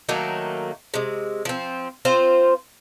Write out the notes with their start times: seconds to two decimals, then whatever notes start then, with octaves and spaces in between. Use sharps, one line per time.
0.09 D#3 F#3 A3 A#3
0.94 C3 G#3
1.45 F3 C4
2.05 C4 F4 C5